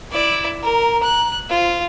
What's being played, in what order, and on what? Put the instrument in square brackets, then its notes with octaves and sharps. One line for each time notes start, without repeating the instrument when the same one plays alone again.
[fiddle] E4 D5
[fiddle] A#4 [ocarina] A#5
[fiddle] F#6
[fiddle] F4 [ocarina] C5